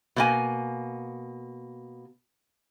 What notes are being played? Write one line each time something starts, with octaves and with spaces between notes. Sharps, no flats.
B2 A#3 G#5